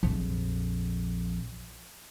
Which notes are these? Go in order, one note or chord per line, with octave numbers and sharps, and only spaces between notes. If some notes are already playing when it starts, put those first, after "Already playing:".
A#1 F2